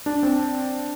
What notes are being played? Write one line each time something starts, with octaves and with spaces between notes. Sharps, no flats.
D4
C4